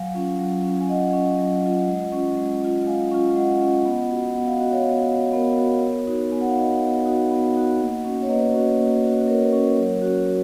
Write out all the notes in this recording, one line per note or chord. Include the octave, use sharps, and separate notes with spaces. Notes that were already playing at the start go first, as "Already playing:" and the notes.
Already playing: F#3 F5 G#5
C#4 F4
F#3
C#4 F4
G#5
F#3 D#5 F#5
C#4 F4
F#3
C#4 F4
G#3
C#4 F4
G#3
C#4 F4
G#3 F5 G#5
C#4 F4
G#3 D#5 F#5
C#4 F4
B3
F#4
B3 F#5
F5
F#4 D#5
C#5 F5
B3
F#4
B3 A#4 C#5
F#4
B3
D#4 F#4
B3 G#5
F#5
F5
D#4 F#4 D#5 F#5
B3
D#4 F#4
B3
D#4 F#4
A#3
C#4 F#4
C#5
A#3 B4 D#5
C#4 F#4
A#3
C#4 F#4
A#3 A#4 C#5
C#4 F#4
F#3
C#4 F#4
F#3 F#4